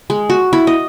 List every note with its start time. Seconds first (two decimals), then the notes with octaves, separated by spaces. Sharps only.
0.10 G#3
0.30 F#4
0.53 E4
0.67 D#5